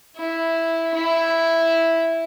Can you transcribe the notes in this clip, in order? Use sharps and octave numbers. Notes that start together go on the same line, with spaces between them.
E4
E4